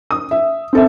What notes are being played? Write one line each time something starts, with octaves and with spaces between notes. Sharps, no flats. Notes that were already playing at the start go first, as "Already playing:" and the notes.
D#6
E5
C4 A4 E5